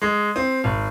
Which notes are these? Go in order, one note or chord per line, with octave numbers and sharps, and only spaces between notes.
G#3
C4
G#1